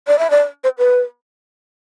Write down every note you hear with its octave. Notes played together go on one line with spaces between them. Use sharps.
D5
E5
D5
C5
B4